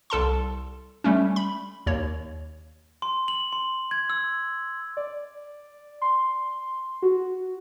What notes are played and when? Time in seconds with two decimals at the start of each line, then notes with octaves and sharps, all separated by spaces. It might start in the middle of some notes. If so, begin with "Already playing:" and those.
0.10 C2 A4 A5 C6
1.04 G3 A3 C#4
1.36 B5
1.86 D#2 C#5
3.02 C6
3.28 F#7
3.53 C6
3.91 G#6
4.10 E6
4.97 D5
6.01 C6
7.02 F#4